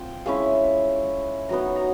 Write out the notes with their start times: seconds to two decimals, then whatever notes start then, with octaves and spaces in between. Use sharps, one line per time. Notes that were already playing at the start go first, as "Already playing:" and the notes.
Already playing: C4 F4 G5
0.26 G#3 C#4 E4 F5
1.49 F#3 B3 D#4 A#5
1.76 A#5